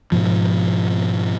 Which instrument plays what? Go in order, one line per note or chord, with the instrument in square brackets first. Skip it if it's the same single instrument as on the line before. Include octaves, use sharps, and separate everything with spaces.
[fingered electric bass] G#2 B2 F3